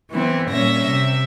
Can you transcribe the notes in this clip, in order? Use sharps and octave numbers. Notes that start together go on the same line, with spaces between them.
E3 B3 C4 E4
A#2 G3 C#4 E5 A#6
C3 E5